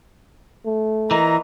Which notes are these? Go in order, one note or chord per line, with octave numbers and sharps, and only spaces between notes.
A3
A#2 E3 D#5 A#5